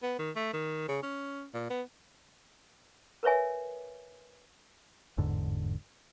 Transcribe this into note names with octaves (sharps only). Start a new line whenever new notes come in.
B3
D#3
A3
D#3
C#3
C#4
A#2
B3
A#4 B4 C#5 E5 G#5
G1 E2 G#2 D3